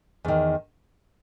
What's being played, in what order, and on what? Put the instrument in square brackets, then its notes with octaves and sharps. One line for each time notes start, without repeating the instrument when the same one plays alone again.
[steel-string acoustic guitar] E2 D#3